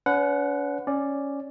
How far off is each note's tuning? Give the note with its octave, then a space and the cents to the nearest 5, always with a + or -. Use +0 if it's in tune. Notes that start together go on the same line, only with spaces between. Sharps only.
C#4 +45 B4 +30 F#5 -5
C#4 +0 D5 +0